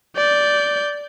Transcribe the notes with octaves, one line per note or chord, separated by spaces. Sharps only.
D5 G6